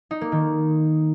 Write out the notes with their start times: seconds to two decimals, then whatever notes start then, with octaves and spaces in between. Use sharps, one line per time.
0.11 D#4
0.21 A#3
0.32 D#3